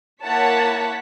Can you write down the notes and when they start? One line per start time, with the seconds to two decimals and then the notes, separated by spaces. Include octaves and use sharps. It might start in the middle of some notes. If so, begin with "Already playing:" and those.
0.23 A#3 E4 C#5 F#5 A5 B6